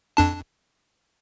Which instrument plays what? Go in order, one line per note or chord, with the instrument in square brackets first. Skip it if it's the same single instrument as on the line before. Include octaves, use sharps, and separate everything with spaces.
[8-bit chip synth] F2 D4 A5